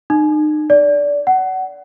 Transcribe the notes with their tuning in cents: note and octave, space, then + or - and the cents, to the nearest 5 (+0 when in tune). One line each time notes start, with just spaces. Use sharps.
D#4 -35
D5 -20
F#5 +20